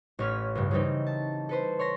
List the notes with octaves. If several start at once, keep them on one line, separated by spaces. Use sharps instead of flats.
A1 C#4 F6 B6
C#2 G2
C#3 E3 G3 C4 D#4
A5
A4 B4 C5
C#5 C6 A#6 B6